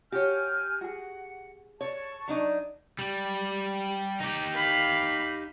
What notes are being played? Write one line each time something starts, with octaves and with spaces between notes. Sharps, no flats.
F#4 G4 C#5 G#5 F6 G6
F#4 G#4 F#5
C#5 A5 C#6
F#3 D4 D#4
G3
D#4 G4
F5 B5